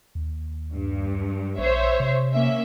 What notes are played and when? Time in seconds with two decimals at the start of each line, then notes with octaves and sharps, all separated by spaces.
0.15 D#2
0.72 G2
1.58 A#1 C5 C#5 E5
2.00 C3
2.33 A#3 C#4 E5